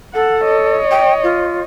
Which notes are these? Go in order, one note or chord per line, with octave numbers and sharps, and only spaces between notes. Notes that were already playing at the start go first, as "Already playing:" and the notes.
A4 F#5
C#5 D#5
G5
F4